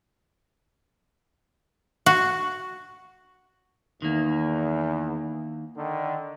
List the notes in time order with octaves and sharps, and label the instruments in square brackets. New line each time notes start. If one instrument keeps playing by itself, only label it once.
[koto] F#4
[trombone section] E2 [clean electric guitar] D#3 A#3
[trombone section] D3 D#3